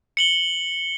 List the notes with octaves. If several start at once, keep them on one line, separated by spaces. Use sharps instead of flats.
C#7 F#7 G7